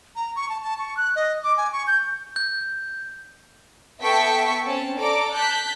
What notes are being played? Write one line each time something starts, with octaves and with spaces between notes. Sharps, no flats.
A#5
C#6
A5
A5
C#6
F#6
D#5
D6
G#5
C#6
G6
G6
B3 A4 E5 G5 C#6 B6
C4 C#4 A5
A4 D5 A#5 D6
A5 F#6 G6 B6